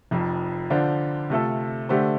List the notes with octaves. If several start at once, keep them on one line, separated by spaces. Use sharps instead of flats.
F1 F2 F3
D3 F3 D4 F4 C5
C3 A3 F4 A4
D3 A3 D4 G4 C5